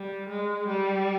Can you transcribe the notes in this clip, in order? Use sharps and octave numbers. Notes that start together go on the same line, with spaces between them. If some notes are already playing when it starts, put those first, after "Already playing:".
Already playing: G3
G#3
G3